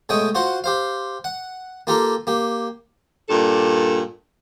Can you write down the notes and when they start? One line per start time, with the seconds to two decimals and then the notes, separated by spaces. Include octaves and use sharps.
0.09 B2 G#3 A3 C#5 G5 D#6
0.35 F4 F#4 C5 F#5
0.64 G4 C5 F5
1.24 F#5
1.87 A#3 F4 G4 A4 A#4 A#5
2.27 A#3 G4
3.30 G2 A#2 A4